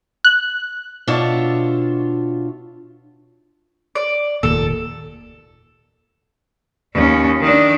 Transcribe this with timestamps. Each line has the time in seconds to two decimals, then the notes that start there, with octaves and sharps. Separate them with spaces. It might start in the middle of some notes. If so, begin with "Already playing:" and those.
0.24 F#6
1.07 B2 D4 F4 C#5 E5
3.95 D5
4.43 F1 D#2 A#2 A4
6.95 D#2 C#4
7.41 D#3 D4